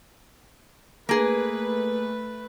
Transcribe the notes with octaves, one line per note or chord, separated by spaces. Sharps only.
A3 A#3 G#4 B4